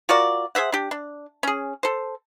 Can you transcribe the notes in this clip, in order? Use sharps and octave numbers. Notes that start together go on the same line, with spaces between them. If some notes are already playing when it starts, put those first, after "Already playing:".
F4 F#4 A#4 D5
G#4 C5 E5 F#5
D4 G4
D4
C#4 G#4
A4 C5